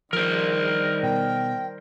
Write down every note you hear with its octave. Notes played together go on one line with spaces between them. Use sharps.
D#3 F3 G3 A#4 C5
B2 G5